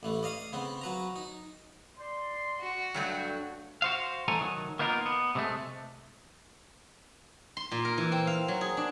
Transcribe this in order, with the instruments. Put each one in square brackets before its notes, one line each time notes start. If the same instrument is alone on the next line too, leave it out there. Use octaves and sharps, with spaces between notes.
[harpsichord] A1 E3 A3
D5 D#5 F5 D#6
C#3 B3 C4
F#3 B4 A#5
D#4
[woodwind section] D5 C6
[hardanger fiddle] F#4
[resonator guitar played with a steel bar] G2 F#3 A3 [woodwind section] D5 F5 G5
[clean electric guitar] F#4 C5 F5
C2 E3 A3 A4 G#5 A#5
D#3 F#3
A#3 B3 D#4 F4 A#4
B3
C3 G#3 A3
[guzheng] C6
A#2
A#4
E3
C4
F5
F#3
G#4
D4